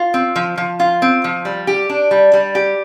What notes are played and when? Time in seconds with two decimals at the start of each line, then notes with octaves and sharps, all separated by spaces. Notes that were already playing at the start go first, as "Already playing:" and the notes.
Already playing: F4
0.14 C4
0.36 F3
0.58 F3
0.80 F4
1.02 C4
1.24 F3
1.45 G3
1.67 G4
1.89 D4
2.11 G3
2.33 G3
2.55 G4